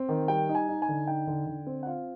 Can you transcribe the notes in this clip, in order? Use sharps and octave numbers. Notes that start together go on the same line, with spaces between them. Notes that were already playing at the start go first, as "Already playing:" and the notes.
Already playing: C4
D#3
G3 G5
D#4
G#5
D#4
G#5
D3
D#4 G5
D3
D3
C4
F#5
F4 F5